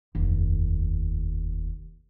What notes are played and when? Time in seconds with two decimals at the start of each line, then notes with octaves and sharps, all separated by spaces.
0.15 F1 D#2